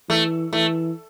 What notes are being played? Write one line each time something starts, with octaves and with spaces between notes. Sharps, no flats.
E3 A3
E3 A3